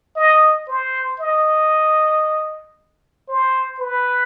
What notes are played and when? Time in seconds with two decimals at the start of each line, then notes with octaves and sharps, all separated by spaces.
0.16 D#5
0.68 C5
1.20 D#5
3.28 C5
3.80 B4